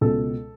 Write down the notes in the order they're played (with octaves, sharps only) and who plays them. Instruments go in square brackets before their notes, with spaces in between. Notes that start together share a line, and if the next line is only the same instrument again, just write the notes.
[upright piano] C#2 B2 G#3 A4